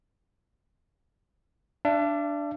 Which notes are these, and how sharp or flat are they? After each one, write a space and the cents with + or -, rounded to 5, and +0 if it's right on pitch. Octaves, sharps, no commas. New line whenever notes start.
D4 +0 E5 +45